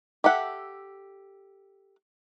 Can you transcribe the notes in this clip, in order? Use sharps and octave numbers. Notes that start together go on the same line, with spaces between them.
G4 A4 E5 F#5